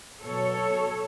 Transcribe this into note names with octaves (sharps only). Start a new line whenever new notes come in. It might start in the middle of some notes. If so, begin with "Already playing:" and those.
B2 F#3 A4 C#5